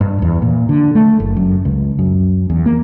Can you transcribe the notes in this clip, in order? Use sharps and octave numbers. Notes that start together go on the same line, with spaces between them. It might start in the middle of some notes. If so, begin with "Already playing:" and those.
G2
E2
A#2
D3
A3
F#1
F#2
C#2
F#2
E2
A#3